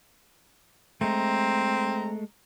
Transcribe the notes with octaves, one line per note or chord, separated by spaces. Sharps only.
G#3 A3 C4 A#5